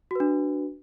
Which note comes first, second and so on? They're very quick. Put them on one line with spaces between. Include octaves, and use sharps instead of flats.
F#4 B4 D4